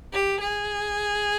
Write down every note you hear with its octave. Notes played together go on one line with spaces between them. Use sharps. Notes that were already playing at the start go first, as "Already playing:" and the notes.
G4
G#4